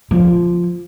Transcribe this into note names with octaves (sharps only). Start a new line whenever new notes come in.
F3